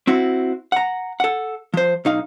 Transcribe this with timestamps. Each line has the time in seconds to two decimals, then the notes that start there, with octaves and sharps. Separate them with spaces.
0.07 C4 E4 F#4
0.72 F#5 A#5
1.20 A4 F#5
1.74 F3 C5
2.05 B1 D#4 F5